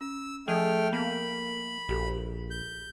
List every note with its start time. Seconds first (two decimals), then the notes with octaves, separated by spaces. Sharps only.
0.01 C#4 E6
0.48 F3 A3 G#4 G5 F6
0.93 A#3 B3 B5
1.89 A#1 F#4 G4 A4
2.51 G6